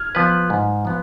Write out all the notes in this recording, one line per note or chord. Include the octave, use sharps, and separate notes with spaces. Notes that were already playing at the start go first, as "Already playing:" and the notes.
Already playing: F6 G#6
F3 B3 F4 B4
G#2
F3 B3